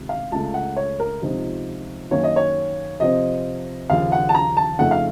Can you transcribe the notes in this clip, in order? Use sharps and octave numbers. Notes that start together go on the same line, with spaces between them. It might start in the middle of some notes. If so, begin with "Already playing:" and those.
Already playing: C#2 C3 D#3
F5
C#2 C#3 A3 A5
F#5
C#5
A#4
C#2 C3 F3 C4 D#4
F#2 D#3 A#3 C#4 C#5
D#5
C#5
C3 F3 C4 D#5
D#2 C#3 F3 F5
F#5
A5
A#5
A5
F2 C#3 A3 D#4 F#5
F5